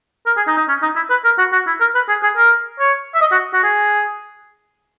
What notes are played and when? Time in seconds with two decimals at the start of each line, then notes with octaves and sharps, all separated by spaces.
0.26 A#4
0.37 G#4
0.48 D#4
0.58 D#4
0.68 C#4
0.82 D#4
0.96 E4
1.10 B4
1.24 A#4
1.38 F#4
1.53 F#4
1.67 E4
1.80 A#4
1.95 B4
2.08 G#4
2.23 G#4
2.37 A#4
2.80 C#5
3.15 E5
3.21 D#5
3.32 F#4
3.53 F#4
3.63 G#4